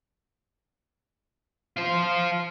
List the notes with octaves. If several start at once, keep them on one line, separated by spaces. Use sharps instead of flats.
F4 C5